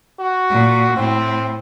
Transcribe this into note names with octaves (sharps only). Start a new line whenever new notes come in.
F#4
A#2
A2 C4